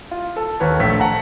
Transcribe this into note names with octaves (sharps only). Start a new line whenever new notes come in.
F4
A4
D#2 B4 C#5
A#1 A3 B6
F#5 A5 A#5